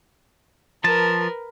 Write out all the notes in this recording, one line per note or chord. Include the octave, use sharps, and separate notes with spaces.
F3 A#4 B4 A5